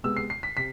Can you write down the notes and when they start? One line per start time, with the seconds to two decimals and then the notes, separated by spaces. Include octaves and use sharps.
0.03 C3 G#3 B3 E6
0.17 C7
0.30 C7
0.43 B6
0.57 C3 B6